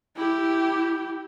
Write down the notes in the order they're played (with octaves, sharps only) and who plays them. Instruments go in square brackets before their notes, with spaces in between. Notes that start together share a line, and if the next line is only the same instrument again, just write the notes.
[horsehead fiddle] E4 G4